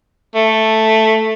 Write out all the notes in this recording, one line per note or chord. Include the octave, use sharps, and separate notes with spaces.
A3